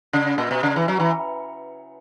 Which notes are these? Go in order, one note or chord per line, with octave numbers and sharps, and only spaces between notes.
C#3
A#2
B2
C#3
E3
F#3
E3